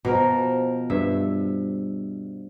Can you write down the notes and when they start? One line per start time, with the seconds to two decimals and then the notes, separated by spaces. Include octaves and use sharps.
0.05 B2 F3 A#4
0.90 G2 E5